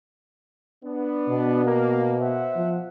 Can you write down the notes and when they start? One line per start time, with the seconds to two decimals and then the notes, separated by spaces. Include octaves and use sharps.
0.85 B3 D4
1.29 B2
1.66 A#3
2.20 C5 E5 F#5
2.56 F3